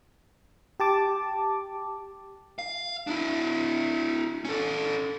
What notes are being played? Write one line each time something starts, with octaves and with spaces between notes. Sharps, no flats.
G4 A5 D6
F5
D4 E4
C#4 A4